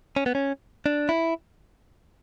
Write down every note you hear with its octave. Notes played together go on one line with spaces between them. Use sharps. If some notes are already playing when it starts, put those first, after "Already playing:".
C#4
B3
C#4
D4
E4